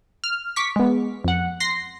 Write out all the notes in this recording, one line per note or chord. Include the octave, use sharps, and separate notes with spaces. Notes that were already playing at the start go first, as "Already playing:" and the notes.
F6
C#6 D6 B6
G#3 B3
F2 F#5
C6 A#6 C7